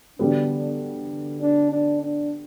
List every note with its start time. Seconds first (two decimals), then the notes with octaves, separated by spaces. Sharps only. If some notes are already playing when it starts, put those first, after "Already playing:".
0.19 D3 G3 B3 D4 F#4
1.41 D4
1.71 D4
2.02 D4